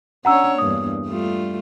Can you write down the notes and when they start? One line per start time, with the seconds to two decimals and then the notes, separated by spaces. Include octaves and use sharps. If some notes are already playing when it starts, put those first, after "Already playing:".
0.25 C#4 D4 C#5 F#5 A#5 E6
0.58 E2 G2 A#3 D#6
1.06 G3 A3 F4